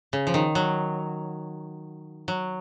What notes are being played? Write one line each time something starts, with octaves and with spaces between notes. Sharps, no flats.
C#3
F3
D#3
F#3
F#3